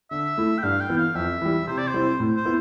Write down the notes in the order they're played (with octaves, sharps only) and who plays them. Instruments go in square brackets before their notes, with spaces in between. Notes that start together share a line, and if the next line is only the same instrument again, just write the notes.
[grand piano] D3 [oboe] E5
[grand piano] A3 E4
[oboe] G5
[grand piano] G2 [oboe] F5
[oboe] G5
[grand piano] E3 B3
[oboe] F5
[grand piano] F2 [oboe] E5
[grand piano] E3 G3
[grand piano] C3 [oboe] C5
[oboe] D5
C5
[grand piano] G3 C4 E4
A2
[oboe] C5
[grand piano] B3 E4